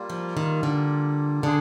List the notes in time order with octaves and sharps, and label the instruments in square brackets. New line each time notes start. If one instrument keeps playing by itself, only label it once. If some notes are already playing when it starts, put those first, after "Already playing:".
Already playing: [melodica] G3 A#3 F4
[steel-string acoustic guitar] F3
D#3
D3
[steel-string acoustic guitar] D3 [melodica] D4 G#4